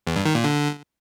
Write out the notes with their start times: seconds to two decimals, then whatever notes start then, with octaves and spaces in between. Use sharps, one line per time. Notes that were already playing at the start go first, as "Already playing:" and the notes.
0.07 E2
0.16 G2
0.25 D#3
0.35 A#2
0.44 D3